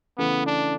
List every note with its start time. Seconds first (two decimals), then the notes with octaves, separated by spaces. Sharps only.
0.18 C#3 E3 A3 B3
0.46 D4